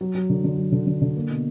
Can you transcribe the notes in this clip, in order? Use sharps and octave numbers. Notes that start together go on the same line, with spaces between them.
F#3
F#3
D3
D3
F#3
D3
D3
D3
A#3
B2